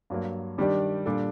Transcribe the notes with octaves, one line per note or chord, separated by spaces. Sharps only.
G2 F#3 A#3
D#3 G3 D4 G4 D5
A#2 G3 D4 A4